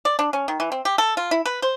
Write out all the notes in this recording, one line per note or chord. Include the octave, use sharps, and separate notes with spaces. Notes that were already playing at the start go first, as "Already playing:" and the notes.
D5
D4
C#4
D#3
E3
C4
G4
A4
F4
E4
B4
C5